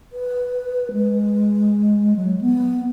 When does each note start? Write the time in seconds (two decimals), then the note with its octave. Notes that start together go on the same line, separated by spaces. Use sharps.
0.13 B4
0.92 G#3
2.16 F#3
2.41 B3